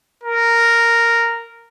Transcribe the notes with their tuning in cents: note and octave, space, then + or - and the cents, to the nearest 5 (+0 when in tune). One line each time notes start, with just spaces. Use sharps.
A#4 -5